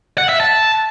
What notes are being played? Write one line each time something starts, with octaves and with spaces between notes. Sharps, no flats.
F#5
E5
A5